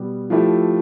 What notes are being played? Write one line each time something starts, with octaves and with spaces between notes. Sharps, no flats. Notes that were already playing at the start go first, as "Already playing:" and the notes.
Already playing: B2 G3 B3
F3 A3 E4 G4